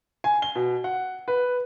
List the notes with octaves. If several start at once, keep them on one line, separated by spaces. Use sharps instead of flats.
G#5
G7
B2
F#5
B4